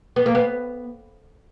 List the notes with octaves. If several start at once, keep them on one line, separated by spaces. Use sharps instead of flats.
B3
A#3
B3